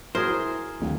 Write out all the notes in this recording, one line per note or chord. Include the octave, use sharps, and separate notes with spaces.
E4 F#4 G#4 A#4 C5
D1 D#2